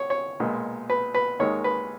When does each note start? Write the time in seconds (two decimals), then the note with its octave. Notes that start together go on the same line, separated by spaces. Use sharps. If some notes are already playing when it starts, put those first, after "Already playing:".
Already playing: C#5
0.10 C#5
0.40 B1 A#2 G#3
0.90 B4
1.14 B4
1.39 D#2 D#3 G#3 C#5
1.64 B4